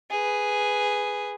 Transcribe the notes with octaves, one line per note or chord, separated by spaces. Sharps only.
G#4 B4